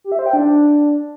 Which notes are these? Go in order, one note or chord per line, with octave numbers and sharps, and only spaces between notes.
G4
E5
C5
G5
D4